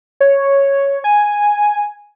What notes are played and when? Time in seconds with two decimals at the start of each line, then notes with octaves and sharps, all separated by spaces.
0.20 C#5
1.04 G#5